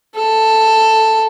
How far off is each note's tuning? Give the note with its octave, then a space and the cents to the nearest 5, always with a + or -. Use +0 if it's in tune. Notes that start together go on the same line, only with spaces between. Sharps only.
A4 +5